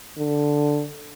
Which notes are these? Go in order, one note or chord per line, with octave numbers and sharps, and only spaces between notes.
D3